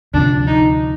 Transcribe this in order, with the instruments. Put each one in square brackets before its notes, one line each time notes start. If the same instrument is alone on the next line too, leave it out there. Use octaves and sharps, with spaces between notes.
[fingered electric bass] D2 C3 F3 [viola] D4
[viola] D#4